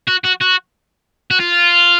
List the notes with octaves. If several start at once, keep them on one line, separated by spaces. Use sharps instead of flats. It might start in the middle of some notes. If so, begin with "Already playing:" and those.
F#4
F#4
F#4
F#4
F4